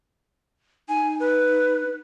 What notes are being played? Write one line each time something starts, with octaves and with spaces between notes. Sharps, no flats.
D#4 G#5
B4